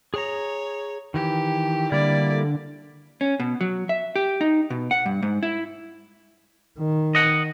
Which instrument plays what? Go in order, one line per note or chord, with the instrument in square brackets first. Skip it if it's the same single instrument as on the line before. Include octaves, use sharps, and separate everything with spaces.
[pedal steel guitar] G#4 A#5 [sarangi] C#5
[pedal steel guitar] D#3 E3 [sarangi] G4
[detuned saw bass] D3 [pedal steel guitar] G3 A#3 E4 [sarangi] D5
[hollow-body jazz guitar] C#4
B2
F#3
E5
G4
D#4
B2
F#5
G2
G#2
E4
[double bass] D#3
[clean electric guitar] D#5 F#5